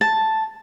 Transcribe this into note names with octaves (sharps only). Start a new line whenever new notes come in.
A5